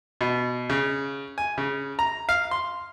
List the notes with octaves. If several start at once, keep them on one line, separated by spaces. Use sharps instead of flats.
B2
C#3
G#5
C#3
A#5
F5
C6